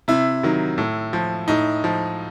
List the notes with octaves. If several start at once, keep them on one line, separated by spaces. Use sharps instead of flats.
C3 E4
D#3 F#3
A2
F3
A2 D#4
F3